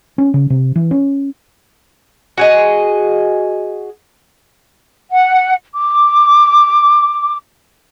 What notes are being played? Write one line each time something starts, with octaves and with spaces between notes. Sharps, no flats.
C#4
C#3
C3
E3
C#4
F#4 G#4 D#5
F#5
D6